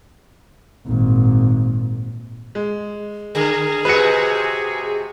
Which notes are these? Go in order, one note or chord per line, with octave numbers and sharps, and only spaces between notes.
G#1 A#2
G#3
D3 G#4
C3 G#3 F#4 B4 C#7